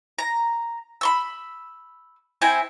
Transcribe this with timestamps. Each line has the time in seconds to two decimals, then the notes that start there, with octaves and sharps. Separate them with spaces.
0.19 A#5
1.01 B5 C6 E6
2.42 C4 E4 G5 G#5